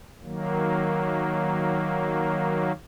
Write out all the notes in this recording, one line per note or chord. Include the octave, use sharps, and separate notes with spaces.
D#3 F#3 A#3